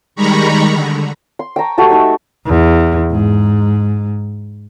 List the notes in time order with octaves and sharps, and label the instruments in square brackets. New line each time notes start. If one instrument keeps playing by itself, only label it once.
[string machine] D#3 G3 G#3 A#5 B5 C#6
D3
[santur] C6
G5 A5 A#5 C#6
A3 F#4 G4 A5
A3 D#4 E5
[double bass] E2
G#2